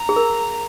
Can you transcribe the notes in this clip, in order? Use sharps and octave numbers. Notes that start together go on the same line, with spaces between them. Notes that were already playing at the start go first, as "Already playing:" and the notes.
Already playing: A#5
G#4
A#4